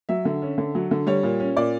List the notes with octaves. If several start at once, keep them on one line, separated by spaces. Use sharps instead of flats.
F#3 E5
D3
C#4
D3
F#3
D3
G3 C#5
A#2
C#4
A#2 D5